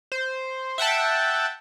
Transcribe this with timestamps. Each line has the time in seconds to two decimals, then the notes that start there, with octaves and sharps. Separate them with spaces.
0.12 C5
0.78 E5 F#5 G5 A5